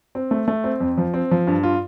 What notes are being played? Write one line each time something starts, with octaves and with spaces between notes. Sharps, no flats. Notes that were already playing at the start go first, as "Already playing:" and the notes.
C4
A3
A3
C4
F2
F3
C4
F3
G2
F4